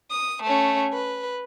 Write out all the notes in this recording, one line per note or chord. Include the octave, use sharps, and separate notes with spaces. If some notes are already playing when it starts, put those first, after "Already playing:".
D#6
A3 C#4
B4